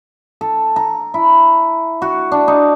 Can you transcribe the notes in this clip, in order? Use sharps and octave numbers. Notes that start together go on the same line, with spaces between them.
A4
A#5
E4
F#4
D4
D#4